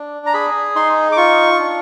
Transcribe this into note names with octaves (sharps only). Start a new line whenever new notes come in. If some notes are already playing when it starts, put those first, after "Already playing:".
Already playing: D4
A#5
G#4 B5
D#4 C6
D6
F4 C#6
D4